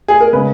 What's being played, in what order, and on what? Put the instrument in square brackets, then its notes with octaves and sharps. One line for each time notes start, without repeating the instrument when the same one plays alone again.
[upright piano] G#4
A#4
C#3 G#3 B4